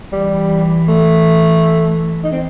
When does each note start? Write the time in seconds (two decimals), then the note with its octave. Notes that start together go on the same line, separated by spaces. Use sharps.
0.12 E3 G3
0.88 A3
2.24 D#4
2.32 C4